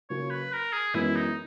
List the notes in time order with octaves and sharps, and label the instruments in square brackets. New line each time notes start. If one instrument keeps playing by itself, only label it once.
[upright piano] C#3 F#3 A#3 C#4 [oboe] C#5
[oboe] B4
A#4
G#4
[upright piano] F#2 E3 G#3 B3 [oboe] E4
[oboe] D#4